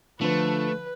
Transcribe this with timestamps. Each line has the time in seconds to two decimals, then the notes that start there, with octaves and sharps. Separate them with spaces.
0.21 D3 F3 A3 B4